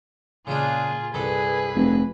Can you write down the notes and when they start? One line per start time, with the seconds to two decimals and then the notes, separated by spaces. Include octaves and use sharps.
0.47 A#2 C#3 G#3 D4 F4 G#4
1.14 C2 G2 G#4 A4 B4
1.75 F1